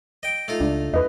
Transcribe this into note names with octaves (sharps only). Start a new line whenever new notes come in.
D#5 G5
A3 D#4 F4
C#2 D4
E2 B4 D#5